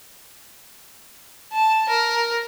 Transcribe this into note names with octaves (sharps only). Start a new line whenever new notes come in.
A5
A#4